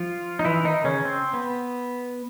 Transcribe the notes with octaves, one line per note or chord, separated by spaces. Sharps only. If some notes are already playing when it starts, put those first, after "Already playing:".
Already playing: F3 F4
D#4
E3 E4
D#3 D#4
C#3 C#4
C4
B3